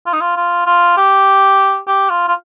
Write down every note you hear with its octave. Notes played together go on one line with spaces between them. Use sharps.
F4
D#4
F4
F4
F4
G4
G4
F4
F4